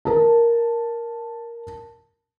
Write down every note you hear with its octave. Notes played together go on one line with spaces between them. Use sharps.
A#4 A5